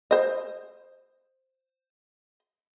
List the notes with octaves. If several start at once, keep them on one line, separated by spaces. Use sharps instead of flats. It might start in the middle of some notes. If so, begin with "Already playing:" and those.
C5 D#5